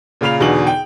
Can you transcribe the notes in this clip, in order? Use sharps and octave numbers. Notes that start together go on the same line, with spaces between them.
A#2 C#3 F5 B5 F7
E2 B2 D3 D#4 G#4 F#7
G5